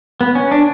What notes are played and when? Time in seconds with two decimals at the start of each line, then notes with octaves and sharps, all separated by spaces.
0.21 B3
0.35 C#4
0.51 D4